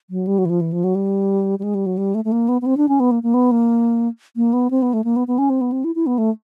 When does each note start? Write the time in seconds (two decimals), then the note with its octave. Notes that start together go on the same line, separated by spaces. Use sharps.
0.10 F#3
0.27 G3
0.38 F#3
0.45 E3
0.49 F3
0.61 E3
0.72 F3
0.84 F#3
0.95 G3
1.59 G3
1.63 G#3
1.75 G3
1.86 F#3
1.97 G3
2.14 A3
2.25 A3
2.32 A#3
2.48 B3
2.62 B3
2.66 C4
2.77 D4
2.88 C#4
3.00 B3
3.11 A#3
3.23 A#3
3.34 B3
3.51 A#3
4.36 A#3
4.53 B3
4.70 C4
4.82 B3
4.93 A3
5.04 A#3
5.16 B3
5.27 B3
5.38 C#4
5.50 C4
5.61 B3
5.72 C4
5.84 E4
5.95 E4
6.06 B3
6.18 A3